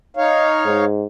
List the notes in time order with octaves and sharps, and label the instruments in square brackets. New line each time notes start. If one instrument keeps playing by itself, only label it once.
[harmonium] D#4 C#5 F5
[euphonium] G#2